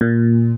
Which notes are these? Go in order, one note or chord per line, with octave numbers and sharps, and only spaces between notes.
A#2